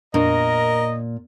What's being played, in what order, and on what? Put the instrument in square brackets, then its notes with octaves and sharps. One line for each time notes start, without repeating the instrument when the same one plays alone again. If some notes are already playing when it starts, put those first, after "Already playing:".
[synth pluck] F2 D4 C#6 [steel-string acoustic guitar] A#2 [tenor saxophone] A#4 [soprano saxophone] D#5